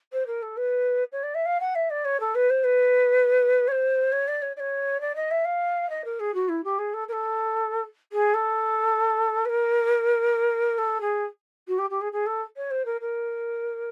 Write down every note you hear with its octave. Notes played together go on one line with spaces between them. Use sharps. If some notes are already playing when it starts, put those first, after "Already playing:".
C5
A#4
A4
B4
C#5
D5
E5
F5
F#5
E5
D5
C#5
A4
B4
C5
B4
C#5
C5
C#5
D5
C#5
D5
C#5
D5
D#5
E5
F5
D#5
A#4
G#4
F#4
E4
G4
G#4
A4
A#4
A4
G#4
A4
B4
A#4
A4
G#4
F#4
G4
G4
G#4
G#4
A4
C#5
C5
A#4
A#4